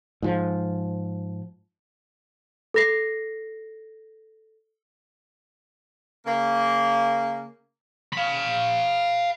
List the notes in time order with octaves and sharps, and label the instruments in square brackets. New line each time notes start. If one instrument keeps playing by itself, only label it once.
[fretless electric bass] G#2 F3
[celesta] A4 A#6 C7
[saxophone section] C#3 A#3
[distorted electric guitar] F5 B5